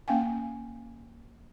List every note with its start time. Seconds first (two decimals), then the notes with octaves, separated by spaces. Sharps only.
0.08 A#3 C#4 F5 G5 G#5